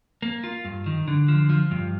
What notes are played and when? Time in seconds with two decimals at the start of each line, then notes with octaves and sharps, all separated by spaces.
0.22 A#3
0.44 F4
0.65 G2
0.86 D#3
1.08 D3
1.28 F3
1.50 F3
1.71 G2